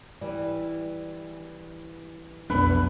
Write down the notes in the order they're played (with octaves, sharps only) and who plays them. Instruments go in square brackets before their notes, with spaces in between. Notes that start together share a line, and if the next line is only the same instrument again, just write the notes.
[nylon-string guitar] E3 G3
[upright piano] F1 [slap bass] B1 B3 D4 [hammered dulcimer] B4